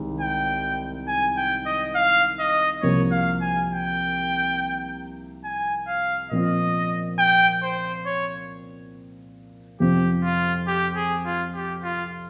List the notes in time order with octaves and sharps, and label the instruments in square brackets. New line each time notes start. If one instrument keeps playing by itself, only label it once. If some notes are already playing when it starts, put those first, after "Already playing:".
Already playing: [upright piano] C2 C3 D#3 G#3
[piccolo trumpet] G5
G#5
G5
D#5
F5
D#5
[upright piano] C2 C3 F3 A#3 [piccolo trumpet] C#5
[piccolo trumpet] F5
G#5
G5
G#5
F5
[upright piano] A#2 F3 C4 F4 [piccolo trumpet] D#5
[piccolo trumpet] G5
C5
C#5
[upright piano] F2 C3 F3 C4 [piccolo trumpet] G4
[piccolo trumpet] F4
G4
G#4
F4
G4
F4